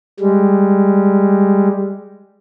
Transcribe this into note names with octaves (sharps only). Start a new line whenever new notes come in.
G3 G#3